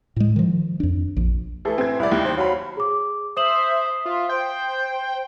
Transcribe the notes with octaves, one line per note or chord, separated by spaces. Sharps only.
A2 G#3
D#3 F3
F2 D4
A#1
E3 A3 G#4 A4
C4 G#6
C2 E4 D5
D#2
C5
F#3 F5 B5
G#4 D6
C5 E5 D#6 E7 F#7
F4 E5 C6
C5 G5